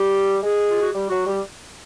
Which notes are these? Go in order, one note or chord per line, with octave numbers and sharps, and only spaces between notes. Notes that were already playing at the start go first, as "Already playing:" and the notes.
Already playing: G3 G4
G#3 G#4
F4
F#4
G3 G4
F#3 F#4
G3 G4